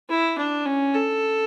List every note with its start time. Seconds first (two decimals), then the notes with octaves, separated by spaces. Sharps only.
0.09 E4
0.38 D4
0.65 C#4
0.94 A4